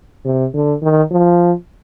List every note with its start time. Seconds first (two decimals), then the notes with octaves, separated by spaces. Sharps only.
0.25 C3
0.54 D3
0.82 D#3
1.11 F3